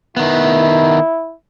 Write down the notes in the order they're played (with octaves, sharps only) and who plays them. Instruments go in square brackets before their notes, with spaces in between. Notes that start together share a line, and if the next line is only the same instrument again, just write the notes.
[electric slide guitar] D#3 B3 [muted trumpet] E4